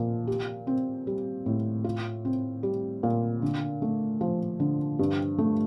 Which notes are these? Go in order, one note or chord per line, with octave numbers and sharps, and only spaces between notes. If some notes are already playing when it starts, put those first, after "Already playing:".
Already playing: A#2 F3
G4
C4
G3
A2
F4
C4
G3
A#2
D3
A3
F3
D3
G2
A3